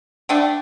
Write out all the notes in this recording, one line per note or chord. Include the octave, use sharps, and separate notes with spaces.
D3 A3 D4 G5